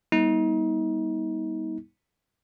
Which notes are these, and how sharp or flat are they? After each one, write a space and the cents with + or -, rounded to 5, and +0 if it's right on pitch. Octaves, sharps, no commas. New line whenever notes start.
G3 +10 B3 -35 D#4 +35